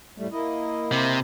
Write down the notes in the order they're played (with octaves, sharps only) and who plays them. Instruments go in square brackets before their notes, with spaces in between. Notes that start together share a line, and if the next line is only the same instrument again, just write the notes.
[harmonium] A2 G3 A3
A#3 E4 D#5
[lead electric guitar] C3